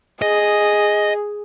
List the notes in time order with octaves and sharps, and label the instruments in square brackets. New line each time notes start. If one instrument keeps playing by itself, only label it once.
[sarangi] G#4 [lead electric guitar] D#5